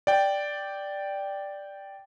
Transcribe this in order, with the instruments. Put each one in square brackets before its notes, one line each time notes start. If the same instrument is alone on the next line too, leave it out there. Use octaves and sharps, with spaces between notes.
[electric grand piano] D5 G5